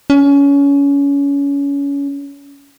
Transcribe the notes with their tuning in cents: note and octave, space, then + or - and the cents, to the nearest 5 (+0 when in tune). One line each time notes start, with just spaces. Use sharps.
C#4 +25